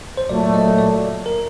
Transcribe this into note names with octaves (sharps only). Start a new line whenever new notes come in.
C5
A#2 F#3 A3 D5
D#5
D5
A#4